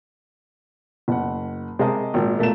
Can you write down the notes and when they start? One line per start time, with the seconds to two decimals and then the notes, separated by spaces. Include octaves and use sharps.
1.08 F#1 F#5
1.79 C3 G#3 A#4 C5 D#5 A5
2.14 G#1 A#2
2.39 E1 A#2 A3 A#3 E7